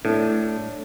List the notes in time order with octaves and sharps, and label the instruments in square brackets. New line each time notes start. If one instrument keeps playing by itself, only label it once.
[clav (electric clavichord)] A2 [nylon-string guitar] D4